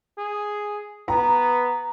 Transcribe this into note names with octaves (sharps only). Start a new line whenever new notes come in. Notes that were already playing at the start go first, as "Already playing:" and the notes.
G#4
B3 A#5